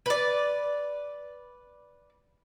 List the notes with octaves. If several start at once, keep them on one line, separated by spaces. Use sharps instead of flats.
B4 D5